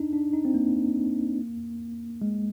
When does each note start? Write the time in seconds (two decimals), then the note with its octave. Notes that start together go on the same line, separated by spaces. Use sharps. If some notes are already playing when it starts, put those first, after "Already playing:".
Already playing: D4 D#4
0.13 D4
0.33 D#4
0.45 C4
0.54 A#3
2.22 G#3